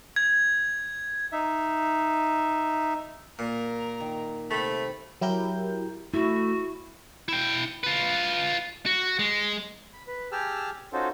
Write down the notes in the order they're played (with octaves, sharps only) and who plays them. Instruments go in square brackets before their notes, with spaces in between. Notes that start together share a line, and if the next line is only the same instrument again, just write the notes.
[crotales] G#6
[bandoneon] D#4 E5
[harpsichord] A#2 [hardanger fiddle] A#4
[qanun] D#3
[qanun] C3 [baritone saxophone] A3 [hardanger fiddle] B5
[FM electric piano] F#3 E4 G4 A#4 G6
[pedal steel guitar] A3 [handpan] E4 [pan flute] F#4
[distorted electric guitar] E4 G5
F4 B4
F#4
G#3
[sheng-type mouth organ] B5
B4
G4 G#4 G5 A5 E6 F6
C#4 D#4 F4 F#4 A4 C5